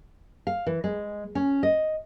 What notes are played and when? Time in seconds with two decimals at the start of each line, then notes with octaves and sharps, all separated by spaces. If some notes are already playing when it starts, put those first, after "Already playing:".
0.47 F5
0.66 E3
0.84 G#3
1.35 C#4
1.63 D#5